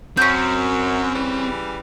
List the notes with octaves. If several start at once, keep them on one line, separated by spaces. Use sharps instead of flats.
F#2 C4 C#4 G6
C#3 E3 G3